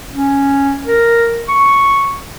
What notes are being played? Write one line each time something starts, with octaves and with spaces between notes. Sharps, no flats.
C#4
A#4
C#6